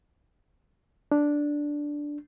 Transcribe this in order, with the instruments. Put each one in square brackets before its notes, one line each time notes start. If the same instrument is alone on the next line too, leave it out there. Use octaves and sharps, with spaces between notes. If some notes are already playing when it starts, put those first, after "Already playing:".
[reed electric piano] D4